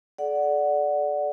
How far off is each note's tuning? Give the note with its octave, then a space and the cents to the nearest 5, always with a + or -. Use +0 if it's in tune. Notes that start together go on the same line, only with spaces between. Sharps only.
A4 -45 D5 -5 F#5 +0